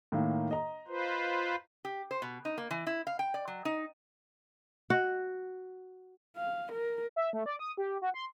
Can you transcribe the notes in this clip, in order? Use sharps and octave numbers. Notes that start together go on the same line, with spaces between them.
A2 D#3 A#3
D#5 A#5
F4 B4 C5
G4
C5
B2
D#4
A#3
E3
E4
F5
G5
D5
F#3
D#4
F#4
F5
A#4
E5
A3
D5
D#6
G4
F#4
C6